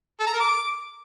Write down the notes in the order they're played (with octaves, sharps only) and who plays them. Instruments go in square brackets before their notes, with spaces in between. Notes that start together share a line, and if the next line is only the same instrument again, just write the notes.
[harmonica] A4
A#5
A#4
D6